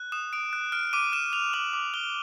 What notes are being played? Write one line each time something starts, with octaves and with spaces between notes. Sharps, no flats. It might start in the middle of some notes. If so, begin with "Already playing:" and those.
Already playing: F#6
D#6 E7
D#6 D7
F#6
F6 D7
D6 D#7
F6 E7
F6 F7
D6 F#7
D6
F6 G7